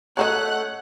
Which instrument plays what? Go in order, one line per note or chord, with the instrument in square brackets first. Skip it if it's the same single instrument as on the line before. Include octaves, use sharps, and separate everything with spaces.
[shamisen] C#3 F#3 D#5 [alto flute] A3 [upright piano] C#5 [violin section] F#5 F#6